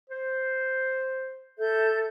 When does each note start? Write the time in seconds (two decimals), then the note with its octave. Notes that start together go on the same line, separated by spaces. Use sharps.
0.09 C5
1.58 A4 E5 G6